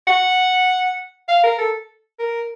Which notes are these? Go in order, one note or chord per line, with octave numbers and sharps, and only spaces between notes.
F#5
F5
A#4
A4
A#4